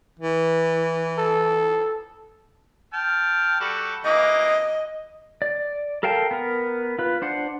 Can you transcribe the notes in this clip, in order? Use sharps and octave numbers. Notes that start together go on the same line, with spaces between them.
E3
A4
G5 A5 F6
G3 F#4 A4
E3 A#3 D#5 D6
D5
A4 A#4 F5 G5 A5
B3 A#4
F4 B4
D4 C5 F#5